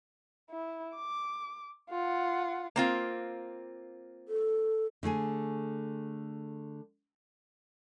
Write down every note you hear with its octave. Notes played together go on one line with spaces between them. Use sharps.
E4
D6
F4 F#5
A#3 C4 F4
A4
D3 A3 G#4 G#5